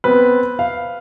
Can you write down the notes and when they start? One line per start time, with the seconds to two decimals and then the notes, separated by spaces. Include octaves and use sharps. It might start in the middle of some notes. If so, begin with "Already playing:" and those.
0.04 B3 C4 B4
0.59 F5